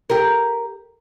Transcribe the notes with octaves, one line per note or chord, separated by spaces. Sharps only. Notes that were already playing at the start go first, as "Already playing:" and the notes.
G4 A#4